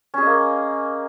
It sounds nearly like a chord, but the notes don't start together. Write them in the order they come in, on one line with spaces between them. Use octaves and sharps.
C#4 G#4 D#5 A#3